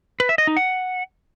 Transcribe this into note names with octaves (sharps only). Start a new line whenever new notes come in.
B4
E5
D#5
D#4
F#5